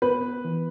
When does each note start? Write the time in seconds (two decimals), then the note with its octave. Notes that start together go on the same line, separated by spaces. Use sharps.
0.02 B3 B4
0.45 E3